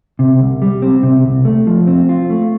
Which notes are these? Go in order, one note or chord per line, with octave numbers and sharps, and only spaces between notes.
C3
C2
G3
C4
C3
C2
A3
F3
C4
F4
A3